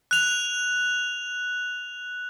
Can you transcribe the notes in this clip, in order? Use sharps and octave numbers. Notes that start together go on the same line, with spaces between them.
F#6 F7